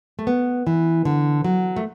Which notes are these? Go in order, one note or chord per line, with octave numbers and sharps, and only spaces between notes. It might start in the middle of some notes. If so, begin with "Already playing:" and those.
A3
B3
E3
D3
F#3
A3